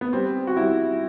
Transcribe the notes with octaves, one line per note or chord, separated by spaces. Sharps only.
B3
G3 C4
F#4
G3 E4